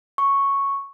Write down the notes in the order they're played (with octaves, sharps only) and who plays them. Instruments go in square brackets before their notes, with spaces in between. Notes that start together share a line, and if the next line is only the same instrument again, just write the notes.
[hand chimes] C#6